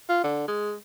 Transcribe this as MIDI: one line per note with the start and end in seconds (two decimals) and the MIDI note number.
0.09 0.23 65
0.23 0.47 50
0.48 0.74 56